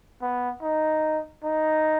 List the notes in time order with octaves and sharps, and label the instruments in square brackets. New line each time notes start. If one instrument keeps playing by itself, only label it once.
[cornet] B3
D#4
D#4